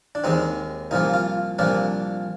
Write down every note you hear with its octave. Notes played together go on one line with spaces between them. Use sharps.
D4
D#2 D#3 G#3 C4 D#4
C2 A#2 F3 A#3 D#4
F4
C2 A#2 F3 A#3 D4